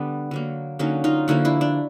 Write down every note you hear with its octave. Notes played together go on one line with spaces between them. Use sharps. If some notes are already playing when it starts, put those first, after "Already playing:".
Already playing: D3 G3 B3 D4
D3 F#3 A#3
D3 F#3 A#3 C#4 D#4
D#4 F4
D3 F3 A#3 E4 F#4
D4 E4
D4